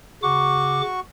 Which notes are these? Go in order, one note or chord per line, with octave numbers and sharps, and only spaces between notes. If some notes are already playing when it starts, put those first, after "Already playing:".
C#3 F#4 C#6 D6